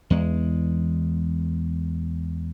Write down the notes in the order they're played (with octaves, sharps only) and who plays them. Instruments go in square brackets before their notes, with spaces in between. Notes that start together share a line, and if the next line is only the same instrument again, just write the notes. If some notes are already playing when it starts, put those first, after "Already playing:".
[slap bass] E2 G#3